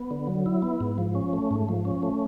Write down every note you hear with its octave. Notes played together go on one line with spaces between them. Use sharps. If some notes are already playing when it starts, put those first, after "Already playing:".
Already playing: B3
D3
F#3
E4
B3
G#2
F3
C#4
A3
G#2
F3
C#4
A3